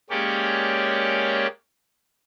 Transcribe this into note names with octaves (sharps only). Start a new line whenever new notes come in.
G#3 A#3 C#4 G4 C#5 D5